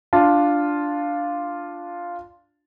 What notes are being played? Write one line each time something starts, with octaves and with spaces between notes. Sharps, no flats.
D4 F4 A5